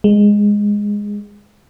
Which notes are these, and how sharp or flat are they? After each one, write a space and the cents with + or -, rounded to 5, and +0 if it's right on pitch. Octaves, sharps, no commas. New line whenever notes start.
G#3 -10